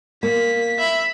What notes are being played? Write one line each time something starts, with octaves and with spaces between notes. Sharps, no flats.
A#3 B6
E5 B5